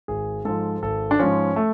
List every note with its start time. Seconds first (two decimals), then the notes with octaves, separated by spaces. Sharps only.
0.08 G#1 G#4
0.45 G#2 F3 A4
0.82 G#1 A4
1.11 D4
1.19 G#2 F3 C#4
1.56 A3